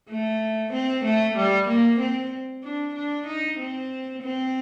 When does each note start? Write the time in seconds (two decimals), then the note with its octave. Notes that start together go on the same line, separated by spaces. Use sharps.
0.10 A3
0.73 C4
1.05 A3
1.37 G3
1.68 A#3
2.00 C4
2.63 D4
2.95 D4
3.27 D#4
3.59 C4
4.23 C4